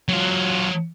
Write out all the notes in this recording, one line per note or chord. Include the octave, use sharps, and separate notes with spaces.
F#3 F4